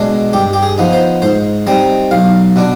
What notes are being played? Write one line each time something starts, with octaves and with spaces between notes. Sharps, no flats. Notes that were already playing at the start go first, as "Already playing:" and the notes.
Already playing: B2 G#3 D4
G2 G4
G4
G#4
F3 B3 D#4
C5
G#2 C5
G3 C4 D#4 D#5
B1 F5
B2 B3 D4